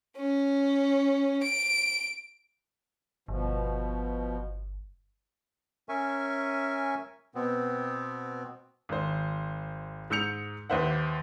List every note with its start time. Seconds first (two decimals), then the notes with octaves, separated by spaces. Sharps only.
0.17 C#4
1.43 D7
3.28 G1 B2 F3
5.89 C#4 A#4 E5 G#5 C#6
7.35 B2 B3 C4
8.89 G#1 C5
10.10 G#2 E6 G6 C#7 F7
10.70 D#2 B4 C5 E5 F#5